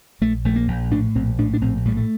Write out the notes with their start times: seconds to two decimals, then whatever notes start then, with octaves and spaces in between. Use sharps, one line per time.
0.21 A#1 A3
0.45 A#1 A3
0.56 A#3
0.68 A#1
0.91 A2 D4
1.15 A#1 C4
1.38 A2 D4
1.54 D4
1.61 A#1 C4
1.85 A2 G3
1.97 A3